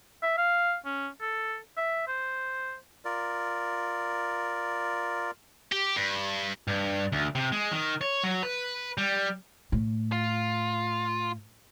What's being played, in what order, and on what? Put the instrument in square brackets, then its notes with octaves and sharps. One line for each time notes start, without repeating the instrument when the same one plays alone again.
[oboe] E5
F5
C#4
A4
E5
C5
[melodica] F4 A#4 D5
[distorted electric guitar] G4
G2
[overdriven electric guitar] G2
D2
C3
G#3
D#3
C#5
F#3
B4
G3
[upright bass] A2
[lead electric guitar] F4